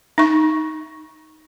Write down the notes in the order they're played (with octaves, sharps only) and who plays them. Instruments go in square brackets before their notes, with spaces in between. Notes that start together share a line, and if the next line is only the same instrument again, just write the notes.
[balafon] D#4 C#6